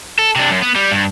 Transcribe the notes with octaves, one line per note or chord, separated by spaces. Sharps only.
A4
C3 D4
F#2
B3
G3
G2